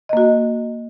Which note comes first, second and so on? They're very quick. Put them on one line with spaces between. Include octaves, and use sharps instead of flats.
D#5 A#3 F#4